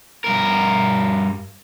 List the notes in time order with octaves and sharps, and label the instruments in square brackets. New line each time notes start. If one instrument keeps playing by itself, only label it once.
[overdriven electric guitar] G2 A#4